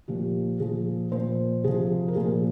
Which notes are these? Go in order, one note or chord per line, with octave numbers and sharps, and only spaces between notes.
A#2 F3 G4
A#2 F3 G#4
A#2 F3 C5
C3 F3 G#4
A#4
A#2 F3 G#4